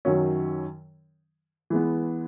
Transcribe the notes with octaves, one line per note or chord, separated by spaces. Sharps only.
F#2 D#3 F#3 C#4
E3 G#3 B3